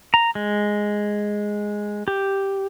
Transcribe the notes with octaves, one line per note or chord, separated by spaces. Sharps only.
A#5
G#3
G4